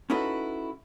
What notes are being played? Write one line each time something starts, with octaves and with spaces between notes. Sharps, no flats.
C#4 D#4 E4 F#4 A4 B4